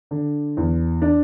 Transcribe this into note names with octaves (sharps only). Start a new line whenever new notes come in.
D3
E2
D4